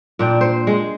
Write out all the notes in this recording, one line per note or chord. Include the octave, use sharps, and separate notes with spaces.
A#2 D4 G5
C5
G#3